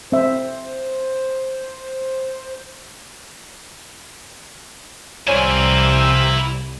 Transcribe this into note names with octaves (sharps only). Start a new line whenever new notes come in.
C4 C5 E5
C2 A#3 C4 E4 C#5 D5 G#5